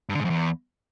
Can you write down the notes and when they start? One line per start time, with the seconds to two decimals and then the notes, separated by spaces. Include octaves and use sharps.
0.09 G2
0.15 D3
0.20 G#2
0.25 F2
0.30 E2